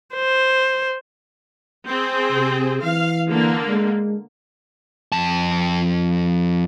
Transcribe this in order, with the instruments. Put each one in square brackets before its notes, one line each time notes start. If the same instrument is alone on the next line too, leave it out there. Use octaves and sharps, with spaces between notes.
[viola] C5
[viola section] C4 G#4
[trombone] C3
[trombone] E3 [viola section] F5
[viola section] D3 A#3
[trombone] G#3
[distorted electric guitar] F2 A5